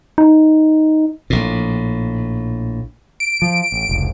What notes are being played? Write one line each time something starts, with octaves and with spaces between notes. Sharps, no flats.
D#4
A#1 A2
D7
F3
A1
F1 C#2